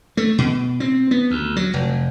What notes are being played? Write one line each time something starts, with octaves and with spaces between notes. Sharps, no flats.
A3
B2
C4
B3
D2
F#3
F1